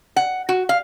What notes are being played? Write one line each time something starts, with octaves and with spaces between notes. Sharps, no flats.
F#5
F#4
F5